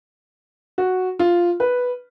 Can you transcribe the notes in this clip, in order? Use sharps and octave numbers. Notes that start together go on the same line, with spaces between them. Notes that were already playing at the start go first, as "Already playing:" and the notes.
F#4
F4
B4